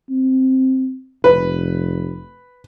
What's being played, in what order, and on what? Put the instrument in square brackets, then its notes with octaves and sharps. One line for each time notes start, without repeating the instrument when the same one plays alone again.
[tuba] C4
[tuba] F1 [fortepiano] B4